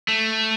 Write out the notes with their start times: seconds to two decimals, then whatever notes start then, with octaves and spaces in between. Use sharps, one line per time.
0.08 A3